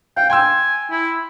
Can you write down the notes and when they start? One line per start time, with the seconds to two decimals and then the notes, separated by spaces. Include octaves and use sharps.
0.17 F5 G5
0.30 G5 G#5 C6 E6
0.90 E4